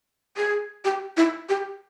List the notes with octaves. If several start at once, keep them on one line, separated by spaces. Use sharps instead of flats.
G#4
G4
E4
G4